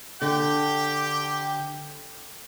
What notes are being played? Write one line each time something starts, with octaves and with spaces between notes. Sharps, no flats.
D3 G4 G5